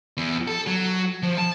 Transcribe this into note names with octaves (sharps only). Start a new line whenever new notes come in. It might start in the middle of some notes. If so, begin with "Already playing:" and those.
E2
A4
F#3
F3
A5